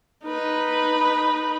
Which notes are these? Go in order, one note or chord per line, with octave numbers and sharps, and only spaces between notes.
D#4 B4